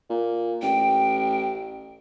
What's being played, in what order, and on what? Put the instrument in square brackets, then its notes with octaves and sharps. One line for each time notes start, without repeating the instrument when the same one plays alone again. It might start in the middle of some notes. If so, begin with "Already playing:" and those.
[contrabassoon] A#2
[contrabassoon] A1 [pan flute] G5